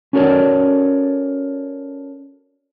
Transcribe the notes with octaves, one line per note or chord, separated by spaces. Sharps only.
C#4 F#4 A4 A#4 C#5 D5